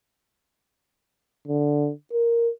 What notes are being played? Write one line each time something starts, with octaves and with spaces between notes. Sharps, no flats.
D3
A#4